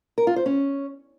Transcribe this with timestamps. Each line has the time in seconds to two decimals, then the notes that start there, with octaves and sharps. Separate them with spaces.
0.18 A#4
0.27 F4
0.36 C5
0.46 C#4